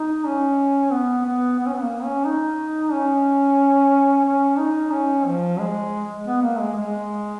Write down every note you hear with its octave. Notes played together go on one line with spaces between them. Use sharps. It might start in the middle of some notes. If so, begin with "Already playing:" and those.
Already playing: D#4
C#4
B3
B3
B3
C#4
B3
A#3
C#4
D#4
C#4
C#4
D#4
C#4
F3
G#3
B3
A#3
G#3
G#3